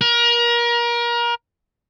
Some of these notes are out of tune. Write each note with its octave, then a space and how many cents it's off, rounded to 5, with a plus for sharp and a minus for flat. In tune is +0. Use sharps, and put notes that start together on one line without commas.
A#4 +30